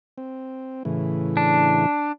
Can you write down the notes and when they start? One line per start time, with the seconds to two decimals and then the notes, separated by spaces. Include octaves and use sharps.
0.18 C4
0.85 A2 C#3 E3
1.37 D4